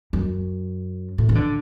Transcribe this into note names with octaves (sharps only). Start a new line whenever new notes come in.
F#2
A2
E3
D3